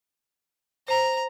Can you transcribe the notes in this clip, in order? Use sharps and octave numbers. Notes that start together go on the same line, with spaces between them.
C5 A#5